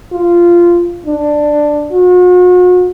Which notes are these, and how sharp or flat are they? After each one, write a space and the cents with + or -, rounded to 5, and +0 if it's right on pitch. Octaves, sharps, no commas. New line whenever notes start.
F4 -10
D4 +10
F#4 -45